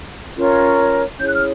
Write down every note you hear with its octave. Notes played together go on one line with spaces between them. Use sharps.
C#4 F4 A#4 C#5
C#4 E4 G#4 C#5 G6
F#6
F6